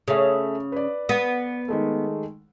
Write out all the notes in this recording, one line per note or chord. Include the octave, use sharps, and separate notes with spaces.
C#3 A3 G#4 E5
B4 D5
B3
D#3 G#3 A3